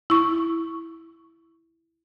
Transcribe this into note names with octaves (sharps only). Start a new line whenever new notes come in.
E4 C#6